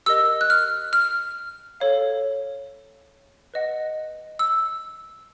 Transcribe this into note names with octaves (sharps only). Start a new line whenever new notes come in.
G4 A#4 D#5 E6
F#6
F6
F6
A4 C#5 F5
B4 D#5 F#5
E6